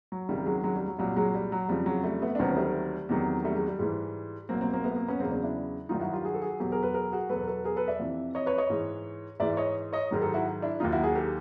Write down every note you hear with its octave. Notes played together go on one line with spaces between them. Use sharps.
F#3
C#2 C3 D#3 G3
F#3 G#3
F#3 G#3
G3
F#3
C2 A#2 F#3 G3
F#3 G#3
G3
F#3
F2 C#3 F3 G3
F#3 G#3
G3 A3
A3 B3
D4
D2 C3 D#3 F#3 B3 C#4
G3 A3
E2 C3 D#3 F#3
G3 A3
F#3 G#3
G3
G#2 E3 G3
C2 B2 F#3 A#3 C4
A#3 C4
A#3 C4
A3 B3
A#3 C4
B3 C#4
E2 C#3 F#3 A#3 C4
C4 D4
D4 E4
G2 D#3 F#3 D#4 F4
E4 F#4
F4 G4
F#4 G#4
A4
F#4 G#4
E2 B2 F#3 G4 A4
G#4 A#4
A4 B4
G#4 A#4
F#4 G#4
E2 B2 F#3 A4 B4
A#4
A4 B4
G#4 A#4
A4 B4
D5 E5
F2 C3 E3
C#5 D#5
B4 C#5
C#5 D#5
G#2 E3
G#2 E3 D5 E5
C#5 D#5
C#5 D#5
G#2 D#3 F#3 A#4
G4 A4
E4 F#4
D4 E4
D#2 D#3 F#3 D#4 F4
E4 F#4
F#4 G#4
G4 A4